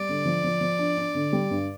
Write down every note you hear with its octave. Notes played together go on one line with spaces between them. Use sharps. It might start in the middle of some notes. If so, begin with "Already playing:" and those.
Already playing: G3 D5
D3
F3
F3
F3
D4
D4
D3
G3
G2